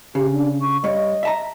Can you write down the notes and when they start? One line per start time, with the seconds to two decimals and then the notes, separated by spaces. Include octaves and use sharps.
0.15 C#3 G4
0.33 D4
0.62 C#6
0.84 G2 C#5 D#5
1.23 E5 A5 A#5